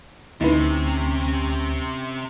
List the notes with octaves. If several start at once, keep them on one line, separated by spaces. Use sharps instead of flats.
D2 C3 C#4 D#4 E4 B4